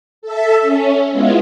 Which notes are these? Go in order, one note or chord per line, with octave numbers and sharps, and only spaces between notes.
A4 E5
C#4
G#3 B3 E4 F4